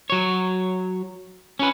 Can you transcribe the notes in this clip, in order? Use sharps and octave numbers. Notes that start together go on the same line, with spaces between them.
F#3 C#5
C#4 B4